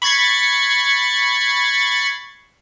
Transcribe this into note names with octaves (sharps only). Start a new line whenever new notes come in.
B5 C#6 G#6 A6 C7